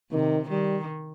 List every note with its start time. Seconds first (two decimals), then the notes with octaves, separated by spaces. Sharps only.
0.11 C3 D#3
0.50 D#3 G3